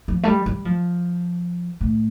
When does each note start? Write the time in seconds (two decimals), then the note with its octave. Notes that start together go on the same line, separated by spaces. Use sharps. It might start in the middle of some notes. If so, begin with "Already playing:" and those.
0.08 F3
0.23 A3
0.27 G3
0.46 G3
0.65 F3
1.81 A2